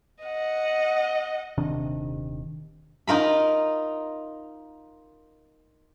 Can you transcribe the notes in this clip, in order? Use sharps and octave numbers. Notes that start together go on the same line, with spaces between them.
D#5 F#5
D#1 C3 D#3 D4
D#4 F4 A#4 B5